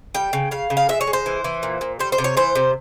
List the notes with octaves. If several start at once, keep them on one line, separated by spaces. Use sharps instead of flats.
G3 G5
C#3
C#3 F5
C#3
F5
G#3 E5
C#5
G#3
C5
E3
E3
A#2
A#2
G3 C5
C5
C3
C#5
E3 C5
C3